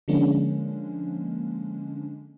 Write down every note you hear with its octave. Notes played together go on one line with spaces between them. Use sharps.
D3 F3 G#3 A#3 C#4 D4